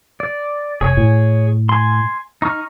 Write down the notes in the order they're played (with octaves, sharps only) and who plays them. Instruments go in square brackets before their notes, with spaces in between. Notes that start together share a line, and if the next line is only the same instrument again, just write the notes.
[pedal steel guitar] D5
[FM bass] F1 [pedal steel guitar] G#4 C#5 G#5
[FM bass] A2
[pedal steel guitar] G#5 C6
D#4 C#6 F6